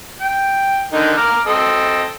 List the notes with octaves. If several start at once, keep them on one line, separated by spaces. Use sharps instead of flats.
G5
D3 D#3 D#4
A#5 D6 F6
C4 A4 D#5